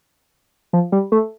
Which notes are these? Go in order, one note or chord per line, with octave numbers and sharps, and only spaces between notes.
F3
G3
A3